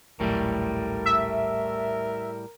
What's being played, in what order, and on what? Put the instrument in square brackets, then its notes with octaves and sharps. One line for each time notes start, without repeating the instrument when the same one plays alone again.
[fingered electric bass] D#1 A#1 F#3 [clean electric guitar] A2 G3 A3 [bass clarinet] A#4
[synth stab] E5